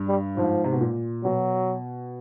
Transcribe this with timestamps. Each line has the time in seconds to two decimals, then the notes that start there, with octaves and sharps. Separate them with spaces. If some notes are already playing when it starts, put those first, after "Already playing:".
Already playing: G2
0.08 G3
0.37 G#2 F3
0.64 C3
0.72 B2
0.81 A#2
1.24 B2 F#3